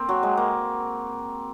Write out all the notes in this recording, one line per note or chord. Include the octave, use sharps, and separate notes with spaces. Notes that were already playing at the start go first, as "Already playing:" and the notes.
Already playing: A#3 C4
F#3
G#3
A#3